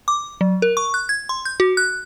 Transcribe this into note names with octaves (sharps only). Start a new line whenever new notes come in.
D6
F#3
A#4
C#6
F#6
G#6
C6
G6
F#4
F#6